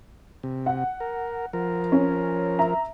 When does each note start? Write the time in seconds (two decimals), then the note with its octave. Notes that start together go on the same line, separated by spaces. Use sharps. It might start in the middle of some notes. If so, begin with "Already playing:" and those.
0.43 C3
0.66 F#5
1.00 A#4
1.53 F3 A#4
1.92 C#4
2.59 E5 A#5